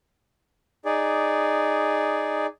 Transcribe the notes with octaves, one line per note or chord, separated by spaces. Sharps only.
D#4 G#4 D5